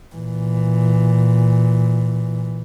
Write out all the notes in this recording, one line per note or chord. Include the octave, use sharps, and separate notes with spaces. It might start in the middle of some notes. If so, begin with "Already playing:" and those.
A#2 E3